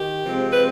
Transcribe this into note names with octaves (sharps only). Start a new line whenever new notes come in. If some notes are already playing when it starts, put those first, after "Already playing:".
Already playing: D#3 G4
C3 F3 G#3 C4
B4